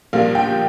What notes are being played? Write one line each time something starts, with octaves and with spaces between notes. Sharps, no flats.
A#1 A#2 G3 F5
G5